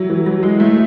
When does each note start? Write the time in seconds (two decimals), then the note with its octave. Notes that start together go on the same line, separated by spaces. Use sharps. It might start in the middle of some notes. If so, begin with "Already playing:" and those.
Already playing: F#3 E4
0.09 E3
0.26 F#3
0.43 G#3
0.60 A3